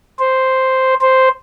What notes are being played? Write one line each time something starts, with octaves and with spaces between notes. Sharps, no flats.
C5
C5